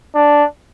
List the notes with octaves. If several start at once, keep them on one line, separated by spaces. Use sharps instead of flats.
D4